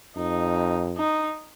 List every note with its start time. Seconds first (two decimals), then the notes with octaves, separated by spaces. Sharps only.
0.16 F2 D#4
0.97 D#4